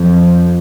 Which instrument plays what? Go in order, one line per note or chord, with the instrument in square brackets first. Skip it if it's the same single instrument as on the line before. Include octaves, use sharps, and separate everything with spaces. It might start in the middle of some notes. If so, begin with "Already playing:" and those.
Already playing: [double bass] F2